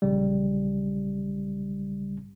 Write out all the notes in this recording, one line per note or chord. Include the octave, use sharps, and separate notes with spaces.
A#1 C#3 G3